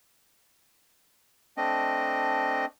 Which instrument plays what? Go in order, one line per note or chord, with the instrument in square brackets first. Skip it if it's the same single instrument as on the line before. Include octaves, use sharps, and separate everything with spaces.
[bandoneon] A3 C4 D4 D#5